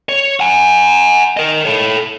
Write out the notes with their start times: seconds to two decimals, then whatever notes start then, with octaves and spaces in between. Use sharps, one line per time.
0.09 C#5
0.40 F#5 G#5
1.37 A#4 D#5
1.65 A4 C#5